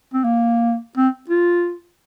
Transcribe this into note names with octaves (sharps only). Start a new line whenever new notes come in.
C4
A#3
C4
F4